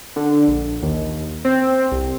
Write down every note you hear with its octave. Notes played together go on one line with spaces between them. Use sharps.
D3
A#1
D#2
C4
C2